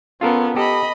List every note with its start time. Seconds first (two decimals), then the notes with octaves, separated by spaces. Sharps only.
0.21 B3 C#4 F4 A4 A#4
0.56 G4 A4 D#5 B5